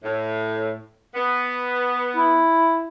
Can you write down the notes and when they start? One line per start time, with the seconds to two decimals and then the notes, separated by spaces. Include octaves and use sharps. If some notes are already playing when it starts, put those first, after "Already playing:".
0.03 A2
1.15 B3
2.16 E4